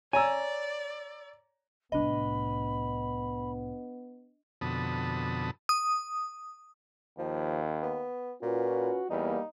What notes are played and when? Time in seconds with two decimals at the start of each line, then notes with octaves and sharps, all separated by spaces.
0.13 C#5 D5 G#5 A#5 E6
1.92 C2 A2 B3 D4 D#5 B5
4.61 F2 B2 D3 A5 B5 D#6
5.69 D#6
7.18 D#2 F3
7.83 B3
8.42 A#2 C#4 F4 F#4 B4
9.10 E2 G3 A#3 D#4